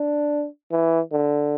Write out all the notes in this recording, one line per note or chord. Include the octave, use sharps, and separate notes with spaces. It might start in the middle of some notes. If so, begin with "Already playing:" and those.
Already playing: D4
E3
D3